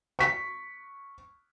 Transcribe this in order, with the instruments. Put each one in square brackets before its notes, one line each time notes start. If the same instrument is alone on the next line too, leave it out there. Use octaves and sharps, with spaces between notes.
[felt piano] C#6 B6